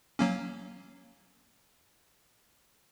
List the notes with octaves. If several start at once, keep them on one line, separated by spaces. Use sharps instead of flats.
F#3 A#3 C#4